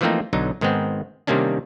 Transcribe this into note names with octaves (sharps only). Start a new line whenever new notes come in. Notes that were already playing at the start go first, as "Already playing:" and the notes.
E3 F3 A3 A#3 C4 D#4
B1 D3 F#3 D#4
G#2 D#3 G#3 B3 C4
C3 D#3 G3 A#3 C#4 D4